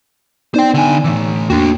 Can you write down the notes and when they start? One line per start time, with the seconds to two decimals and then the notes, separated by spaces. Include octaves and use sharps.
0.54 B3 D#4 C5 D5 G5
0.74 D3 G#5
1.04 A2 E3 E6
1.50 E2 A#3 D4 F#4 G5